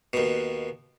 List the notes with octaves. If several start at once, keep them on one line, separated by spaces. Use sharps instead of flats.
D#2 B2